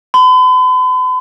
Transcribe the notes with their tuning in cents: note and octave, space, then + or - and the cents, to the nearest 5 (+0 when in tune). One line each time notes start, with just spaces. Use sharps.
B5 +45